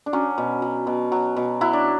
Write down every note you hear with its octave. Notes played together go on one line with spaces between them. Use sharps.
D4
F#3 C#4
B2
F#3
B2
F#3
B2
F#3 E4
D4